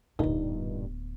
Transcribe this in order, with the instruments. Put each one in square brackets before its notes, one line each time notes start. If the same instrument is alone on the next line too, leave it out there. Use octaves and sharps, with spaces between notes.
[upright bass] D1 B3 [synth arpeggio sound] G2 A#2 D3 [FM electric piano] D#4